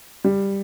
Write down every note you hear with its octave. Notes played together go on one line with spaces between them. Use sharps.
G3